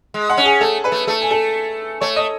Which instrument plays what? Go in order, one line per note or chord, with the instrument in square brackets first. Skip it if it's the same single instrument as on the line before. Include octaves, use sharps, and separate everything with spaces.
[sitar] G#3
[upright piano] F#5
[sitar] C#4
[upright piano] G#4 G#5
[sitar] A3 [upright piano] A4 A5
[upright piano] B4 B5
[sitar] A3
[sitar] A3 [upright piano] A4 A5
[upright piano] G#5
A4 A5
[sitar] A3 [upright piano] C#5 C#6
[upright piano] D#5 D#6